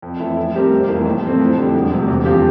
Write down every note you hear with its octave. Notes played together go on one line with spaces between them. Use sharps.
F2
E3 A3 E4 A4
A2
G3 C4 G4 A#4
F1
F2 E3 A#3
A2
E3 A3 C4
F2
D3 G3
E1
D2 C3 G3
E2
D3 F3 C4 G4